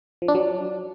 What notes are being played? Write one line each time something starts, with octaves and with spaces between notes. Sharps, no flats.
F3
D4
F#3